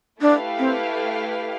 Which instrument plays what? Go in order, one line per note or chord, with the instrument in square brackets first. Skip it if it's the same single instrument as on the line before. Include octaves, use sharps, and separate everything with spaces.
[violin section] A3 E4 G4 B4 F5 [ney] D4
[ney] C4